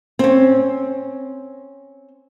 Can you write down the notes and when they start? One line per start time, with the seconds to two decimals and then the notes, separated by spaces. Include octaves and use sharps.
0.19 C4 C#4